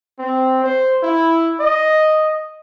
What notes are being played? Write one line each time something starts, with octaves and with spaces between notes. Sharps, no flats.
C4
C5
E4
D#5